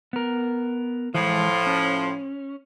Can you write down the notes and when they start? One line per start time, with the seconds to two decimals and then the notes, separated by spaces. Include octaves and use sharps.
0.13 B3 A#4
1.14 A2 E3 F3 G#3
1.67 C#4